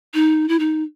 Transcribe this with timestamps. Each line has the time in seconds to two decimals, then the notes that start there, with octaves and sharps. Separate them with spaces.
0.14 D#4
0.49 E4
0.59 D#4